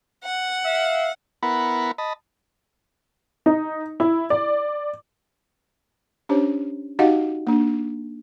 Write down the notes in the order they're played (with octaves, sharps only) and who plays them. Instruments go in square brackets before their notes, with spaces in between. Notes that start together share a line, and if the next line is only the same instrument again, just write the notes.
[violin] F#5
[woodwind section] E5 F5
[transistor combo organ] B3 E4 A#4 F#5 B5
D#5 A5 B5
[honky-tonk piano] D#4
E4
D5
[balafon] C#4 D4 G4 C5 C#5
D#4 F#4 G4 D#5 F5 F#5
A#3 D4